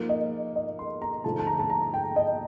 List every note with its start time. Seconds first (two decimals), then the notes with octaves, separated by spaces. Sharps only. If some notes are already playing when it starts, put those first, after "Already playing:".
Already playing: F3 A#3 D#4
0.09 D#5
0.56 D#5
0.79 C6
1.02 A#5
1.24 D3 F3 A3 D#4 A5
1.39 A5
1.47 A#5
1.59 A5
1.70 A#5
1.94 G5
2.16 D#5